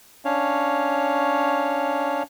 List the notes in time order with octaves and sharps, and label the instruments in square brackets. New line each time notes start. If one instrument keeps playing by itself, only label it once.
[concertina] C#4 D4 C#5 F5